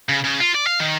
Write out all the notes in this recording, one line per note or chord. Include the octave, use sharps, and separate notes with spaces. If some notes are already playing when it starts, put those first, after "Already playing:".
C#3
C#3
F4
D5
F5
D#3